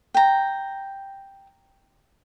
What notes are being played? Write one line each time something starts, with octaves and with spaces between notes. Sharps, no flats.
G5 A#5